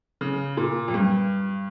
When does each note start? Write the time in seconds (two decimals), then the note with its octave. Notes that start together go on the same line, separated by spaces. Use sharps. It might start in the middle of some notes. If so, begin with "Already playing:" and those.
0.21 C#3
0.57 A#2
0.88 F2
0.94 G2